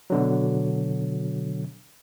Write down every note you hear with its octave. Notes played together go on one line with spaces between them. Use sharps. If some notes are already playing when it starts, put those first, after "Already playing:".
B2 D3 F#3